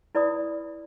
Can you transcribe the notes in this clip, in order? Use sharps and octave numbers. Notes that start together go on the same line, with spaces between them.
E4 B4 D5 B5 D#6